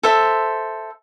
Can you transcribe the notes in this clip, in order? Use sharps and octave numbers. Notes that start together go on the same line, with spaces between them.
A4 C5 E5